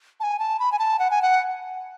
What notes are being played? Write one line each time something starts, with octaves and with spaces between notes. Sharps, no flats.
A5
G#5
A5
B5
G#5
A5
F#5
G#5
F#5